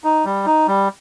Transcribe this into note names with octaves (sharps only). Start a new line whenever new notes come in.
D#4
G3
D#4
G3